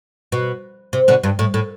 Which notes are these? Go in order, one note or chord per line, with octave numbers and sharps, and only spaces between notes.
B2
C3
B2 D3
G2
A2
A2